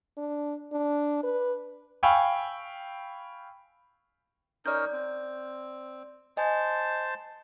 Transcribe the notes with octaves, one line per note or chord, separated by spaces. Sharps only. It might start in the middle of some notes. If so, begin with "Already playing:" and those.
D4
D4
B4
F5 G5 G#5 B5 C#6 E6
C#4 D#4 A#4 D5 G6
C4
C5 D#5 G#5 A5